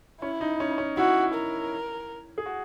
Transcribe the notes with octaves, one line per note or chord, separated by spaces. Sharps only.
C#4 E4
D#4
C#4
C#4
E4 F#4
A#4
G#4
F#4